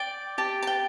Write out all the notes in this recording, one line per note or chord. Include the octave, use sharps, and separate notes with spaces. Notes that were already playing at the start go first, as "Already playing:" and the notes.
Already playing: D5 G5
G4 A5
A5
G5